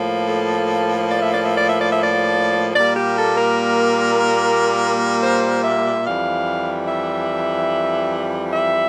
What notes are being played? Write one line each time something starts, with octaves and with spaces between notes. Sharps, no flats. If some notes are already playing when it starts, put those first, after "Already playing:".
Already playing: A2 F3 A#3
A4
D5
E5
D5
E5
D5
E5
D5
E5
D5
A#2 G3 A#3 D5
G4
A4
A#4
C5
E5
F2 E3 G3 F5
E5
E5